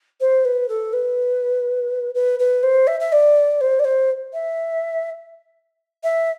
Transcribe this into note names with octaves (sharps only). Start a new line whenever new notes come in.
C5
B4
A4
B4
B4
B4
C5
E5
E5
D5
C5
D5
C5
E5
E5